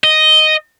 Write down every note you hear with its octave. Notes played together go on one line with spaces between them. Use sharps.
D#5